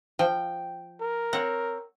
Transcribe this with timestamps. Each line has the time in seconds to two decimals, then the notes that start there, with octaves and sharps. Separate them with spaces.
0.19 F3 G5
1.01 A#4
1.33 C4 C#5 F#5